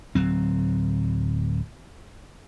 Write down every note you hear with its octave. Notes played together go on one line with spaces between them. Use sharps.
D1 F#3 C4